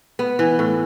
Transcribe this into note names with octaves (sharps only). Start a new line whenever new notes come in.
B3
E3
A2